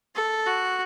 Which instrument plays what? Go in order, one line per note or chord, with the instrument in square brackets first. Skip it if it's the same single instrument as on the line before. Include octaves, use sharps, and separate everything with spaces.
[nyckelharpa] A4
F#4